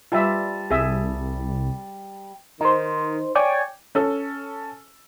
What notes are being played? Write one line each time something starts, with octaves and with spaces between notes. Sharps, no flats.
G3 F4 E5 A5
C2 G#4 E5
D#3 D#4 C5
C#5 D5 G5 G#5
C#4 A4